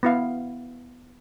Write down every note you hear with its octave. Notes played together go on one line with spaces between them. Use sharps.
B3 E4 F5